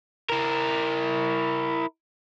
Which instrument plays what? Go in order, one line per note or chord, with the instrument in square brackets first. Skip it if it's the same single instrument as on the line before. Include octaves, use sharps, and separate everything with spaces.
[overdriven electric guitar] E4 A#4